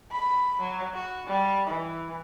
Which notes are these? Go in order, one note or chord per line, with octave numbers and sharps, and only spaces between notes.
B5
F#3
F#4
G3
E3